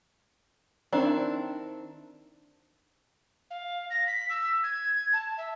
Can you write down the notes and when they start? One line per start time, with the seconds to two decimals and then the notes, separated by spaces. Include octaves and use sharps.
0.92 D#3 C4 D4 E4
3.50 F5
3.90 A#6
4.07 B6
4.30 E6
4.63 G#6
5.13 A5
5.37 E5